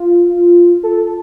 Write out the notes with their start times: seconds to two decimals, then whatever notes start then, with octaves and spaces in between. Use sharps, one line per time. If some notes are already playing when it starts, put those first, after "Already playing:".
Already playing: F4
0.83 A4